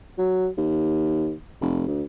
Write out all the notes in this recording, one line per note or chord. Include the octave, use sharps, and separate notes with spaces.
F#3
D#2
F1
D2